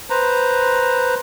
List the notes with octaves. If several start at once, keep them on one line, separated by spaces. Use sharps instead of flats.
B4 C5 A#5